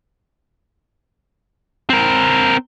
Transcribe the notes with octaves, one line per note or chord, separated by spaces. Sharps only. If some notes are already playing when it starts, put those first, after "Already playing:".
C4 A#4